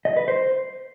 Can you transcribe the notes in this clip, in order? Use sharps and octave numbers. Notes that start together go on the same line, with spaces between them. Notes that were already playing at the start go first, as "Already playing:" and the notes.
D#5
B4
C5